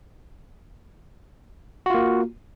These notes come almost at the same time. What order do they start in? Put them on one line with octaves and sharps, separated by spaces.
F#4 F4 A#3